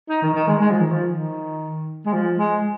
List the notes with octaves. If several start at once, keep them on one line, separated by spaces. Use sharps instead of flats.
D#4
D#3
D#3
G#3
G#3
F3
D#3
F3
D#3
G#3
F3
G#3